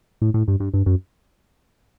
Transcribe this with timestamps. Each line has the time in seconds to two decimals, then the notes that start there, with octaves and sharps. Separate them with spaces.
0.22 A2
0.34 A2
0.48 G2
0.60 G2
0.74 G2
0.86 F#2